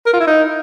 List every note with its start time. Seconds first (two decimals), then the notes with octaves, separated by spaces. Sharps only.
0.06 A#4
0.13 F4
0.20 E4
0.27 D#4